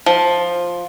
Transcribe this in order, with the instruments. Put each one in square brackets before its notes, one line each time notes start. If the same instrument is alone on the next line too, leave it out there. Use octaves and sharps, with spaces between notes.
[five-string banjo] F3